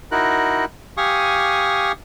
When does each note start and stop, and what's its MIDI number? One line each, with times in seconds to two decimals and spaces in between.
0.12 0.65 63
0.12 0.65 64
0.12 0.65 66
0.12 0.65 70
0.12 0.65 90
0.97 1.92 67
0.97 1.92 77
0.97 1.92 80
0.97 1.92 85
0.97 1.92 87